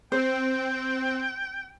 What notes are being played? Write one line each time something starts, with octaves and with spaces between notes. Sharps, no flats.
C4 C5 G5